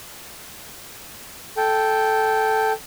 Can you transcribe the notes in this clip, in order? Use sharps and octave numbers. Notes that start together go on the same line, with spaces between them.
A4 G5